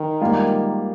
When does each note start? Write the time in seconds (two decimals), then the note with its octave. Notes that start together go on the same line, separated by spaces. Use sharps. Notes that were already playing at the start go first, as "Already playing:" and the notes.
Already playing: D#3
0.21 G#2 G3 A#3 F4